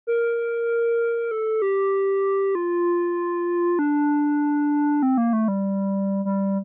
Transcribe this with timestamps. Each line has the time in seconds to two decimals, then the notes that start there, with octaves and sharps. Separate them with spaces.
0.07 A#4
1.31 A4
1.62 G4
2.55 F4
3.79 D4
5.03 C4
5.18 A#3
5.33 A3
5.48 G3
6.25 G3